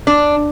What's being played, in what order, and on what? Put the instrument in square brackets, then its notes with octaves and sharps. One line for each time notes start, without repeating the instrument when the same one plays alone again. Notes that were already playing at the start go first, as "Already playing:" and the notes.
[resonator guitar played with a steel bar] D4